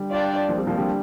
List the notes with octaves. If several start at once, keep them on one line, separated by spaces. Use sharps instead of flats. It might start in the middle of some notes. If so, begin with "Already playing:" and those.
Already playing: D3 G3
D4 F4 D5 G5
F3 A#3
G3 C4
F3 A#3
D3 G3